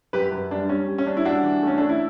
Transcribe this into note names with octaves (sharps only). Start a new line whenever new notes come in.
F#2 G4 B4
F#2
G3 D4
G3 C#4
G3
C#4
G3 D4
E4
G3 D4 F#4
E3
A3 C#4
A3 D4
E4